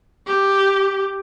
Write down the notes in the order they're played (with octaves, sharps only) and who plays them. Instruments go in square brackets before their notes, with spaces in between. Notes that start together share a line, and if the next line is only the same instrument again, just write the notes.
[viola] G4